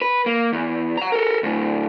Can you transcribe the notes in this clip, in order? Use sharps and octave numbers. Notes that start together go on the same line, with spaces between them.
B4
A#3
E2
F#5 A#5
A4 A#4
D2 A2